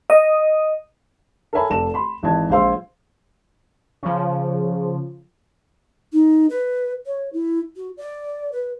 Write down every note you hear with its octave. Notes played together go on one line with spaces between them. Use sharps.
D#5
A4 A#4 C#5 E5 G#5 B5
F1 A4 D5 E7
B5 C6
G#1 E3 D#5 A5 G#6
A#1 G#3 C5 F5 C6 E6
C#3 F3
D#4
B4
C#5
E4
F#4
D5
B4